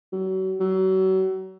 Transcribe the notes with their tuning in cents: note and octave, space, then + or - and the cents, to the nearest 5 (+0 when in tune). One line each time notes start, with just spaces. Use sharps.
F#3 +35
F#3 +35